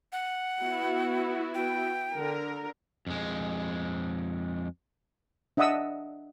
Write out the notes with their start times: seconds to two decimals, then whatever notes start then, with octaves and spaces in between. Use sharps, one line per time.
0.12 F#5
0.61 B3 E4 F#4
1.54 G5
2.14 D3 A#4
3.07 F2 G#3
5.57 D4 D#5 E5 F#5 D#6 E6